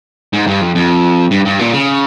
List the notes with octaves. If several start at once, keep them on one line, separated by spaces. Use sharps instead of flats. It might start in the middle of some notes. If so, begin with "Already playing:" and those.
G#2
G2
F2
F2
G2
G2
A#2
C#3